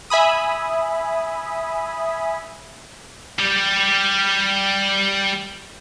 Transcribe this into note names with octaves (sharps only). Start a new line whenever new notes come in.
E5 G#5 B5 D#6
G3 G4